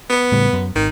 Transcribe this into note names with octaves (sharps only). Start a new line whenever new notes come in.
B3
A2 C#3 G3
F#2
G#1 D#3